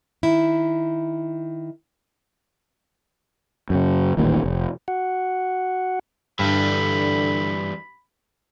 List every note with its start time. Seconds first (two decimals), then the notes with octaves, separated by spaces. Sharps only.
0.23 D#3 E4
3.70 F#2 C#3
4.17 D#1 A1 A#2 D#3
4.44 F1
4.88 F#4 F#5
6.39 G2 D3 E3 G3 B5